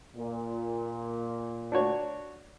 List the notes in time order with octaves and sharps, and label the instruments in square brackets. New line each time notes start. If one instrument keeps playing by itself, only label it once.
[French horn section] A#2
[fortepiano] D4 F#4 C#5